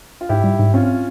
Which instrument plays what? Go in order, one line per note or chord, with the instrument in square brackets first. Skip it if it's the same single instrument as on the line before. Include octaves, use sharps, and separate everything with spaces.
[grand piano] F4
[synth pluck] G#2 [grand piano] E4 G4
[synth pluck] G3
G#2
[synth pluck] C4 [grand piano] C#4 F4